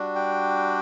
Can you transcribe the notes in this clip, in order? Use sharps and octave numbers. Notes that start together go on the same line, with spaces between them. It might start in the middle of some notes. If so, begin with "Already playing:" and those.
Already playing: G3 D4 F#4
G5